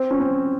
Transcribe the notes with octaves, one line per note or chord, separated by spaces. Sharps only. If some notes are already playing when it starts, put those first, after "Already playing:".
Already playing: C4
C#4
C4